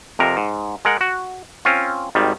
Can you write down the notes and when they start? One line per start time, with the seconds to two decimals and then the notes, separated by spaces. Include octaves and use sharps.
0.19 F2 C3 A#4 A#5
0.37 G#2
0.85 G#3 A#4 F#5
1.01 F#4
1.65 C4 C#4 F4
2.15 G#1 D#3 G3